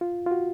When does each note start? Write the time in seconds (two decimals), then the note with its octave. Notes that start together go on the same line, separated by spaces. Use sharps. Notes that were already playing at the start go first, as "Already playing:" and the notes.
0.01 F4
0.26 F4
0.31 F#4